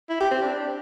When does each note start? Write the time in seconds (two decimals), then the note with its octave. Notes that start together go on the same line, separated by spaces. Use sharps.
0.10 E4
0.20 G4
0.31 C4
0.42 D4